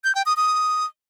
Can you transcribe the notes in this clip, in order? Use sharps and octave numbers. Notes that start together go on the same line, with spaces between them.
G6
G5
D#6
D#6